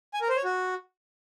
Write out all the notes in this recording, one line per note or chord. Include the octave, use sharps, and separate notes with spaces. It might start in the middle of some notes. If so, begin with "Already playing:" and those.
G#5
A#4
C5
C#5
F#4